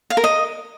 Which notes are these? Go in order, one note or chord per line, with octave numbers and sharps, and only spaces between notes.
F5
A#4
D#5